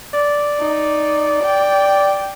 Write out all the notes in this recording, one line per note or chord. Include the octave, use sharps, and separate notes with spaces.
D5
D#4
G5